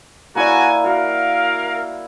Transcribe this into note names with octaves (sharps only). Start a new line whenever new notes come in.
A#3 E4 F#4 D5 F#5 G#5
F#4 A#4 F5